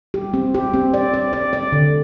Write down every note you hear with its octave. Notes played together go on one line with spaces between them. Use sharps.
G4
C4
G4
C4
D5
D5
D5
D5
D3